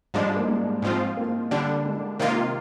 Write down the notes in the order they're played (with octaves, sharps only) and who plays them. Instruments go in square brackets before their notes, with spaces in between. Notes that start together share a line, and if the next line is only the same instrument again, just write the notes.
[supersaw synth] G#2 F3 G#3 D4 [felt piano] G3
[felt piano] A#3
G#3
[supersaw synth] G#2 F3 C4 F4
[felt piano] A#3
[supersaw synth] D3 G3 D4
[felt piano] G#3
[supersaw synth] C3 D#3 A#3 F4